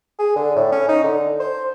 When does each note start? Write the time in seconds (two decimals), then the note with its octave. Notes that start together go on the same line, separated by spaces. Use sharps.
0.19 G#4
0.36 D3
0.56 A2
0.72 C#4
0.89 D#4
1.04 D3
1.40 C5